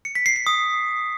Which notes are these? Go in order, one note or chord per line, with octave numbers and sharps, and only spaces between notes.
C#7
B6
C7
C7
D#6